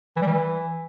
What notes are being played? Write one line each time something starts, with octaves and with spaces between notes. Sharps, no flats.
E3
G3
E3